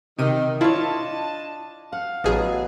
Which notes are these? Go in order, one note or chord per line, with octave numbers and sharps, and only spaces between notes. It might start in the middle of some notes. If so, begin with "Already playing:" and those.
C3 D#3 D#7
D4 E4 F4 C#5 D#5 A5
F5 F#5
A1 B2 F#3 B3 G#4